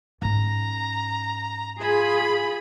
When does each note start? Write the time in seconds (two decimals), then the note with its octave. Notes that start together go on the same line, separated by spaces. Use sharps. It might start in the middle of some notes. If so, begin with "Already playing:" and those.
0.22 G#2 C#4 A#5
1.81 F4 G#4 B5